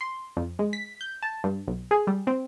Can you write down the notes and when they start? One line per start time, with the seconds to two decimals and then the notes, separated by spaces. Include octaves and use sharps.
0.01 C6
0.37 F2
0.59 G#3
0.73 B6
1.01 G6
1.23 A5
1.44 G2
1.68 B1
1.91 G#4
2.07 G3
2.27 C4